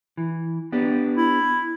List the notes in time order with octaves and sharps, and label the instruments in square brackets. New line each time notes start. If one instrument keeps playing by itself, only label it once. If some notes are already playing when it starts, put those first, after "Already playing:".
[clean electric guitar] E3
B3 D4 G4
[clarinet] E4